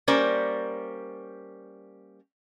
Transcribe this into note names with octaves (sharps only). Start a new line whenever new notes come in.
G3 A#3 C#4 A#4 C5 D5